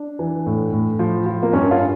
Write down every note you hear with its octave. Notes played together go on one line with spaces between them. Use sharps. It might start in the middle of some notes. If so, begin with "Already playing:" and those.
Already playing: D4
E3
A2
A2
F3
F3
A#3
G2 C#4
F4